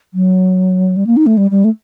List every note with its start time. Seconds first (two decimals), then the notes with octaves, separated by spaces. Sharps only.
0.14 F#3
0.97 G3
1.07 A#3
1.17 D#4
1.26 A3
1.37 G3
1.51 G3
1.64 A3